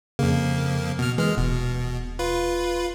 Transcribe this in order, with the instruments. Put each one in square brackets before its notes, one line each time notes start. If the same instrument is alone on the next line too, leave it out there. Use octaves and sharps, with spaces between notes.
[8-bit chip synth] F2 A#3 [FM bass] C#3
[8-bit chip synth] B2 F6
[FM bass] E3 [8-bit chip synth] G#3 F6
[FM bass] D#1 [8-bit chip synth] B2
[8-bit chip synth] F4 B4